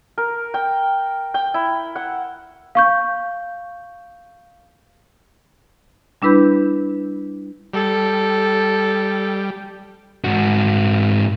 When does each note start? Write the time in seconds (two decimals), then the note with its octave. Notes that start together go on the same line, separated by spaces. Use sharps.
0.18 A#4
0.54 G5
1.34 G5
1.54 E4
1.96 F#5
2.75 F5 C#6 G6
6.22 G3 D4 E4 B4 B5 G6
7.74 G3 A4
10.24 G#2 F#4